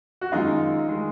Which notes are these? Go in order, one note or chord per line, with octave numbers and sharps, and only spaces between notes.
F#4
F#2 D#3 G#3 D#4 F4
D#3 G#3